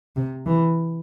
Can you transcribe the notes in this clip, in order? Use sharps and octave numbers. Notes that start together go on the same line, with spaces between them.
C3
E3